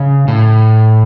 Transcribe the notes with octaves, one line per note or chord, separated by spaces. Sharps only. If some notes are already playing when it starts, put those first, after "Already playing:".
Already playing: C#3
A2